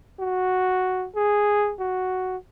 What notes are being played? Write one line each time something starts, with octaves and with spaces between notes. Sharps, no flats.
F#4
G#4
F#4